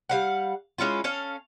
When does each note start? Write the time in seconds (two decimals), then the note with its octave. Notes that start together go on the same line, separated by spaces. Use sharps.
0.09 G3 F5 F#5
0.78 G#3 C#4 E4 F4
1.04 C#4 A4 F5